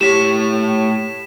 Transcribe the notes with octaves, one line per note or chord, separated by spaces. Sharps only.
A2 G4 C#5 B6 E7